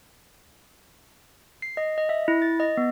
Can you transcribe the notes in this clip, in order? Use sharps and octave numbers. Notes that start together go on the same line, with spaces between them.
C7
D#5
D#5
E5
E4
A6
D#5
B3